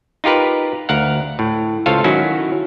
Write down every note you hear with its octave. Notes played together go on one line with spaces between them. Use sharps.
D#4 F4 G4 A#4 B4
D2 A#4 F5 F#5
A2
C#2 F4 A4 C5 C#5 F5
D#3 F#3 C#4 E4 F#4